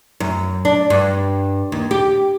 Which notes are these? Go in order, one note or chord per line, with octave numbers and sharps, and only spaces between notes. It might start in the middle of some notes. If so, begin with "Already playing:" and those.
F#2
D4
G2
D#2
G4